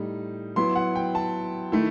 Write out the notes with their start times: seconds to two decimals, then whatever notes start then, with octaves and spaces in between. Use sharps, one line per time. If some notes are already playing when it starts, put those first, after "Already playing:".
Already playing: A2 G3 D#4
0.56 F#3 B3 E4 C6
0.76 F#5
0.96 G5
1.15 A5
1.72 D#3 A3 E4